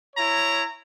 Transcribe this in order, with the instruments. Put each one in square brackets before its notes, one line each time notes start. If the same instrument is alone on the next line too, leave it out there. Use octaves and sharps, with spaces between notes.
[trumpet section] E4 C#5 A#5